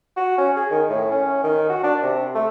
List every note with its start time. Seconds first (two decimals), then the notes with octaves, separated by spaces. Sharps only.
0.17 F#4
0.38 C#4
0.56 G#4
0.71 D#3
0.90 A2
1.11 C#4
1.44 D#3
1.69 F#4
1.84 D4
2.02 C3
2.35 A3